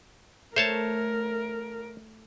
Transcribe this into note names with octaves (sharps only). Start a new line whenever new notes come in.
A3 A#4 C5 C#5 A5